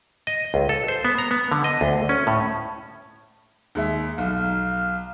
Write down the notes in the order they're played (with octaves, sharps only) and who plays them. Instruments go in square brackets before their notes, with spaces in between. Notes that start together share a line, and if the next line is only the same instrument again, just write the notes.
[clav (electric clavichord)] D#5
C#2
A4
C5
B3
A#5
B3
D3
D#5
D2
C#4
A2
[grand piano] D#2 G#3 E5
[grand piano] B1 [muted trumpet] F5